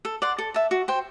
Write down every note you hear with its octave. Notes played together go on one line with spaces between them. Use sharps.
A4
D5 F#5 C6
A4
E5 A5
F#4
C5 G5